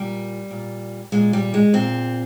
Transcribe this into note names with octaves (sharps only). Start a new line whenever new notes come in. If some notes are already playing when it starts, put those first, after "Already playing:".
Already playing: A#2 G3
A#2
A#2 G#3
G3
G#3
A#2 C4